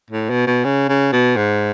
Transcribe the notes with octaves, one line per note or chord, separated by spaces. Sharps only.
A2
B2
B2
C#3
C#3
B2
G#2